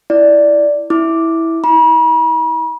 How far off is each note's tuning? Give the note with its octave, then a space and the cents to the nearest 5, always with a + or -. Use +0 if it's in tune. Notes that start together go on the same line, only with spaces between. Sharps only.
E4 +0 D5 +0
E4 -10 D6 +0
E4 -40 B5 -45